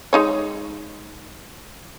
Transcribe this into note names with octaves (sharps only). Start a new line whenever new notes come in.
G#3 D#4 C#5